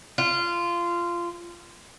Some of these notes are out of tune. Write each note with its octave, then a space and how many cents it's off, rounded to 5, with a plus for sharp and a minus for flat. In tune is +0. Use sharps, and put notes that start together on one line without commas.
F4 -15